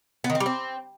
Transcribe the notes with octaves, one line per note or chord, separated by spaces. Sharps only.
B3
D#3
C4
G3
C4